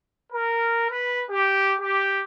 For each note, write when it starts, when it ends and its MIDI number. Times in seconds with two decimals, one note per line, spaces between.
0.33 0.89 70
0.90 1.23 71
1.30 1.74 67
1.80 2.21 67